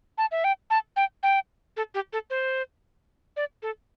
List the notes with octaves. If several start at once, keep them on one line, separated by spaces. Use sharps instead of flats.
A5
E5
G5
A5
G5
G5
A4
G4
A4
C5
D5
A4